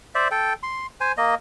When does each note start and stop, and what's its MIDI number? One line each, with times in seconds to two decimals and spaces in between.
0.15 0.28 72
0.15 0.28 74
0.15 0.28 76
0.31 0.53 69
0.31 0.53 79
0.63 0.86 84
1.01 1.12 72
1.01 1.12 80
1.18 1.35 58
1.18 1.35 75